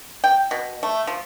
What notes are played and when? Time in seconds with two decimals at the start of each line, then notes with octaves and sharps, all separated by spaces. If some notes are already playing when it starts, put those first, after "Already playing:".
0.24 G5
0.51 B2
0.83 A3
1.07 F3